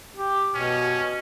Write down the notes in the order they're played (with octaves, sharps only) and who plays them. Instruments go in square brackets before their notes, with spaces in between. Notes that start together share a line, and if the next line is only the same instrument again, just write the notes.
[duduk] G4
[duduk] B2 [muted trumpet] C#4